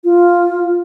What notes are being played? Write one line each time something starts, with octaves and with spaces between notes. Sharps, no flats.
F4